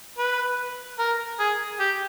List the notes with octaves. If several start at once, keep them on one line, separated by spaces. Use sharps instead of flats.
B4
A#4
G#4
G4